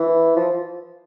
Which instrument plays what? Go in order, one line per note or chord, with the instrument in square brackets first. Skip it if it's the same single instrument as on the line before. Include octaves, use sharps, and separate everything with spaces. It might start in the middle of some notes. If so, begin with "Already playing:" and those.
Already playing: [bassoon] E3
F3